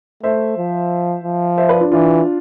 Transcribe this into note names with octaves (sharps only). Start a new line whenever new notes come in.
A3 C5 E5
F3
F3
C5 E5
B4 D5
D4 F4
E3 D4 F4